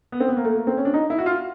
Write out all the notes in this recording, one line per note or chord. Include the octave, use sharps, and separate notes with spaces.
B3
C4
B3
A#3
A3
A#3
C4
C#4
D4
D#4
E4
F#4
F4